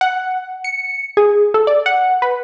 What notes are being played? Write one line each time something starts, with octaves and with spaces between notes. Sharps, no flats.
F#5
C#7
G#4
A4
D5
F#5
B4